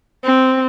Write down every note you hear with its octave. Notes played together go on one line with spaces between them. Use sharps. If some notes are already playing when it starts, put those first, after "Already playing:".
C4